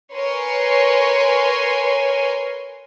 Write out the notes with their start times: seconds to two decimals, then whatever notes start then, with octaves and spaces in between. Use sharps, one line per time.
0.15 A#4 B4 C#5 G#5 C6